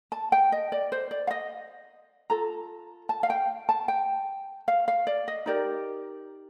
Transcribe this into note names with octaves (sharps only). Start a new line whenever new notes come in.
A5
G5
D#5
D5
C5
D5
F5
D#5
F4 A4 A#5
A5
F5
G5
A5
G5
F5
F5
D5
D#5
D#4 G4 A#4 D5